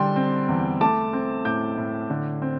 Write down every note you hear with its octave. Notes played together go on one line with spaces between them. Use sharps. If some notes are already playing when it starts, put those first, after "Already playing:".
Already playing: D3 G3 G5 C6
C4
E2
A3 A5 D6
C4
A2 D6 G6
A2
D3
C4